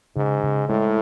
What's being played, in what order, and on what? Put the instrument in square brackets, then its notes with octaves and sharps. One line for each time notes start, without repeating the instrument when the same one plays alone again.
[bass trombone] G#2 [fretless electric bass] C#3
[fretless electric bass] C#3
[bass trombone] A2 [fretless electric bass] G#3